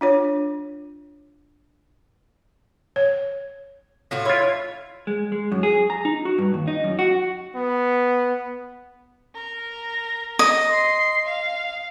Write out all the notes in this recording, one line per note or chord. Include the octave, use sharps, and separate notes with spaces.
D4 F4 C#5
C#5
A2 F4 F#4
E4 F4 C#5
G#3
G#3
F#2
G#4
A#5
D#4
F#4
G2
D#2
D#4
F#2
F#4
B3
A#4
D#5
C6 C7
F5